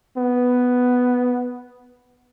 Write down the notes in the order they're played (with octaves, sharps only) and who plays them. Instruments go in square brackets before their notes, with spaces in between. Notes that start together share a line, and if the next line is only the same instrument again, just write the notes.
[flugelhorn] B3